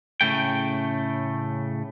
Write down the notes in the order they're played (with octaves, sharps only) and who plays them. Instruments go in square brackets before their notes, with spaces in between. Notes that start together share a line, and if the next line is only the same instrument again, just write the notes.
[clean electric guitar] A2 C#3 A3 G5